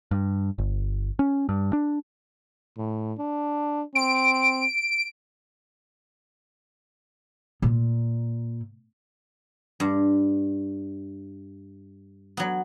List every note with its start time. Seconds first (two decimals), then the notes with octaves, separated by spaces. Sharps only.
0.11 G2
0.58 G1
1.19 C#4
1.49 G2
1.73 D4
2.78 A2
3.19 D4
3.95 C4 D7
7.62 A#2
9.80 G2
12.37 F#3 B3